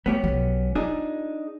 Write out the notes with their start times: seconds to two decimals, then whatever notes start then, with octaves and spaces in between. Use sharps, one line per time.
0.06 A3 B3 C#4 G4
0.24 B1 F#3
0.75 D4 D#4 F4 G#4